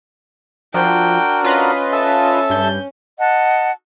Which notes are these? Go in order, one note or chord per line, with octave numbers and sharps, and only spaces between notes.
F3 D4 F#4 A#4 G5
C#4 F4 B4 D#5
A4 E5 A5
G2 G6
D#5 F#5 A5